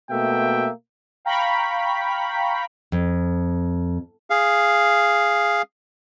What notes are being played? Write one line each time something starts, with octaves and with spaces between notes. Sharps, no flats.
B2 A3 A#3 E5 G5
F5 G5 A#5 B5 C#6 B6
F2
G#4 F5